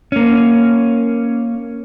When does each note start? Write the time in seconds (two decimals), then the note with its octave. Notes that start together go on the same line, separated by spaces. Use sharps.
0.12 A#3 C#4